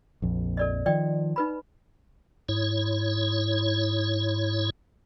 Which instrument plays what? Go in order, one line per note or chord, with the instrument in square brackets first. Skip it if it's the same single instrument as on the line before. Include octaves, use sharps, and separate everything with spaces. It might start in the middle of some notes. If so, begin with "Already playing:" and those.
[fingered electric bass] A#1 F2
[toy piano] A4 D5 D#5
[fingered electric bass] D#3 F3 [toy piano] D5 D#5 G5
[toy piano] D#4 B4 B5
[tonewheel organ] G#2 E4 C#5